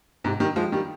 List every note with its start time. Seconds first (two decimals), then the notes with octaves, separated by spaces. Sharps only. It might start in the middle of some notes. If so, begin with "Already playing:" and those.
0.24 G#2 C3
0.40 D#3 G3
0.56 F3 G#3
0.72 D#3 G3